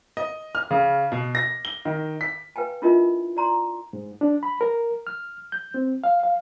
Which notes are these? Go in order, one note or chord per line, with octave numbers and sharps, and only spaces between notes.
D#5
F6
C#3
B2
A#6
G7
D#3
B6
B4 F5 G5 G#5
D4 E4 F4 A#4 D#5 E5
D5 A#5 C6
G#2
D4
B5
A#4
F6
G6
C4
F5
F5